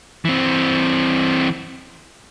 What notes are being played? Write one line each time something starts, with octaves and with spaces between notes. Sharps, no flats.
E3 C4